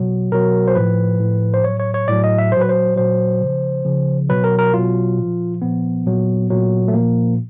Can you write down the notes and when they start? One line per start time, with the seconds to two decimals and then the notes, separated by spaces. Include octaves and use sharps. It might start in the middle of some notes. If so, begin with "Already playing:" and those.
Already playing: B2 F#3
0.32 B2 F#3 A#4
0.68 C5
0.75 A2 F3 B4
1.20 A2 F3
1.54 C5
1.64 A2 F#3 C#5
1.80 C#5
1.94 C#5
2.08 A2 F#3 D5
2.24 D#5
2.38 E5
2.52 A#2 C5
2.57 F#3 B4
2.69 C5
2.96 A#2 F#3 C5
3.41 C#3 F3
3.85 C#3 F3
4.29 B2 F#3 B4
4.44 A#4
4.59 A#4
4.74 B2 F#3 F4
5.18 A#2 F3
5.62 A#2 F3 B3
6.06 A#2 F#3
6.50 A#2 F#3
6.88 A3
6.94 A#2 F3 A#3